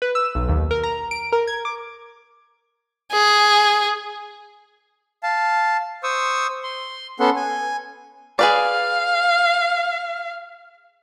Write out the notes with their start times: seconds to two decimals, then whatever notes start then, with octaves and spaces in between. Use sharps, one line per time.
0.02 B4
0.15 E6
0.35 B1
0.49 D#2
0.71 A#4
0.83 A#5
1.11 D7
1.32 A#4
1.47 G#6
1.65 D6
3.12 G#4
5.23 F5 A5
6.03 C5 C#6 D#6 E6
6.64 C6
7.20 B3 C#4 A4 F#5 C6
7.36 G#5
8.39 G#4 B4 D5 F5